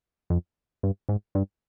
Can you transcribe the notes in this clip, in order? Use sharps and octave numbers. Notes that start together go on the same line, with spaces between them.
F2
G2
G#2
G2